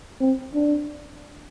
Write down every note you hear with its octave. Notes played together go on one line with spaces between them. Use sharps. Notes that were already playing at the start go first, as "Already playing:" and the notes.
C4
D4